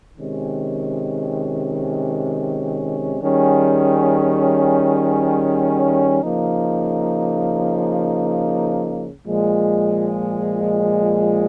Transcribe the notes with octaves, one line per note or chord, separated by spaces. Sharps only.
C3 D#3 G#3 C#4
D#3 G3 C#4 G#4
C#3 F3 A#3 D#4
A#2 F3 G#3